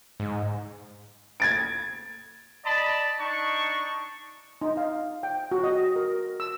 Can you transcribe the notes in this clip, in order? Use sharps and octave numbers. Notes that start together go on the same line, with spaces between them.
G#2
G#6 A6 D7
D5 D#5 A5 B5
D4 D#4 C#6
D#4
F5
G5
F#4
D#5
A#4
E6